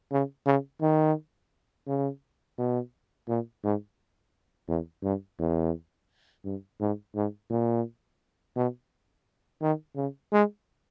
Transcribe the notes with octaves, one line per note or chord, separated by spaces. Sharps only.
C#3
C#3
D#3
C#3
B2
A#2
G#2
E2
G2
E2
G2
G#2
G#2
A#2
B2
D#3
C#3
G#3